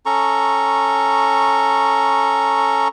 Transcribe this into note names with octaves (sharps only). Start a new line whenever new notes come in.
C#4 A4 A#5 C#6